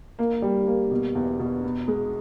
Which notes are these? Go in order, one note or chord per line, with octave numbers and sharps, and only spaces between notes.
A#3
G3
A#3
B2
E2
B2
B3
G#3